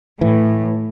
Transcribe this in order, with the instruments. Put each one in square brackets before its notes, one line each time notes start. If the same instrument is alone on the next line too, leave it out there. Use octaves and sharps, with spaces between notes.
[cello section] A2 [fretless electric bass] E3